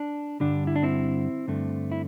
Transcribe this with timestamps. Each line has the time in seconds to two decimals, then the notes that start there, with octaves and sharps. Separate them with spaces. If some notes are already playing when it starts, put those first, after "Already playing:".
Already playing: D4
0.40 G2 D3 G3 D4
0.67 E4
0.76 D4
0.83 C4 E4
1.48 G2 D3 A3
1.92 E4